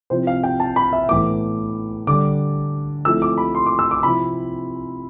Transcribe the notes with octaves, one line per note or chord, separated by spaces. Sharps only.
C3 F3 C4 E4 C5
F5
G5
A5
B5
E5
A2 E3 B3 D6
D3 G3 D4 D6
F3 A3 C4 E4 E6
D6
B5
C6
D6
E6
D6
C3 F3 C4 E4 B5